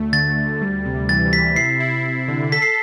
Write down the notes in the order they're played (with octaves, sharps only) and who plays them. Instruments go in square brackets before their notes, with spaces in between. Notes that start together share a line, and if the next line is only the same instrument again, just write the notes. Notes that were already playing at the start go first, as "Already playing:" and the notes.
Already playing: [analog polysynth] D2 A3
[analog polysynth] D3 [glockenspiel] A6
[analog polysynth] D2
G3
C3
[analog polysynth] E3 [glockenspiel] A6
[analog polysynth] C3 [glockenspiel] B6
[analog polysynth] E4 [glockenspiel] C7
[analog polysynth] E4
E4
D3
[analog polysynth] A4 [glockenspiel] B6
[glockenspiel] C7